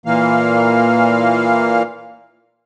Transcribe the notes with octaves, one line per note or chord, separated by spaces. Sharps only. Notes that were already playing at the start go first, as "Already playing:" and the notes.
A#2 E3 A#3 F5